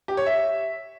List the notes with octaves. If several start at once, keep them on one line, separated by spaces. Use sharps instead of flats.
G4
C#5
E5